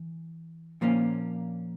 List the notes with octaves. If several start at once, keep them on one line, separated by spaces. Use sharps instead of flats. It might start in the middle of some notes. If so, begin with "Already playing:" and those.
Already playing: E3
A#2 F3 A#3 C#4